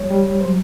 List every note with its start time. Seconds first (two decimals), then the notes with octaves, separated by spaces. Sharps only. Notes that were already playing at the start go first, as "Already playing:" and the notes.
Already playing: G3 C#5
0.11 G3
0.41 F#3 C5